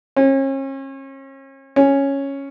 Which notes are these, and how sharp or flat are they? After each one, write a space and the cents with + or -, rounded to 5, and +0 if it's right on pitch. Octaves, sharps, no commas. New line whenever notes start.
C#4 -40
C#4 -5